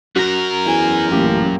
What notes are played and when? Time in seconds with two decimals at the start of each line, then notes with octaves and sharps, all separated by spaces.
0.16 F#2 F#4 A#4
0.66 E2 G#5
1.12 A1 A#2 A#3 G4